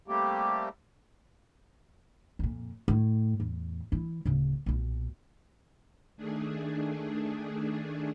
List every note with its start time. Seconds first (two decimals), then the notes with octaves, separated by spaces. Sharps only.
0.08 G3 A3 A#3 C4 G4
2.39 F2 A#2
2.88 A2
3.40 E2 A2
3.92 E3 E4
4.26 D1 C#3
4.66 B1 A#2
6.17 D#3 A3 D4 G#4